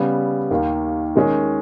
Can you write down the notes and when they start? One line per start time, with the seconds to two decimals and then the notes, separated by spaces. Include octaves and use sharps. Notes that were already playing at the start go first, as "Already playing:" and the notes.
Already playing: C#3 G3 B3
0.51 D#2 D#3 A#3
1.15 D#3 G#3 C#4 G#4